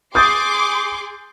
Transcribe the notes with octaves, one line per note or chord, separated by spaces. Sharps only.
G#4 C6 D6 D#6 G6 A6